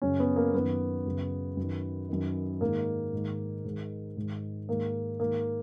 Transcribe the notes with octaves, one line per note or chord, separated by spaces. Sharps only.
F#2 C#3 C#4
B3
A#3
F#2 D#3 B3
F#2 C#3
F#2 D#3
F#2 D#3
G#2 D#3 A#3
G#2 D#3
G#2 D#3
G#2 D#3
G#2 D#3 A#3
G#2 D#3 A#3